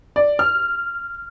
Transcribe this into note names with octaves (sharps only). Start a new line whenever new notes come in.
D5
F6